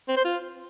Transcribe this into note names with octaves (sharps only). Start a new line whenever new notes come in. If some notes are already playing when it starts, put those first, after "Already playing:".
C4
C5
F4